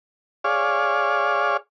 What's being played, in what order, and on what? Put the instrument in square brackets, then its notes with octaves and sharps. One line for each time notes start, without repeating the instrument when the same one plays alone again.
[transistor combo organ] G#4 C#5 D5 F5